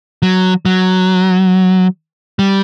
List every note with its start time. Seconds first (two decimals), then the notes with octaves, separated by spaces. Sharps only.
0.22 F#3
0.65 F#3
2.39 G3